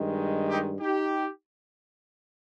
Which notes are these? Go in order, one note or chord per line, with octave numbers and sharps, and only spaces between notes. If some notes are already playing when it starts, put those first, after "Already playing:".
Already playing: G2 D#3 G#3
D#4 G4
D#4 G4